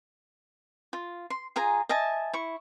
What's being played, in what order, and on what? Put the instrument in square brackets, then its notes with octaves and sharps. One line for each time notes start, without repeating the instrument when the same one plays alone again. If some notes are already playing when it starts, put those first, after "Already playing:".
[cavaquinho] F4
C6
F4 G#4 G#5 A#5
D#5 E5 G#5 A5
E4 C#6